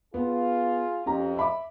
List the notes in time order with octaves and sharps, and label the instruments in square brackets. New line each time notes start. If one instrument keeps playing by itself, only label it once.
[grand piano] B3 [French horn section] F4 G#4
[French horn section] F2 [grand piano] C#4 G4 A#5
[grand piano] E5 B5 D6